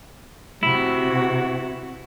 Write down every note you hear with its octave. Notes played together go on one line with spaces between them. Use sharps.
C3 E4 F#4